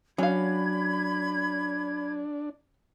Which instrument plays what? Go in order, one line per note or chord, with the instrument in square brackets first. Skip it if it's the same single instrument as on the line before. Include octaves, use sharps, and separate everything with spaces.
[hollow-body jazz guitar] F#3 [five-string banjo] C#4 F5 [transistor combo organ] D4 [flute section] B5 G#6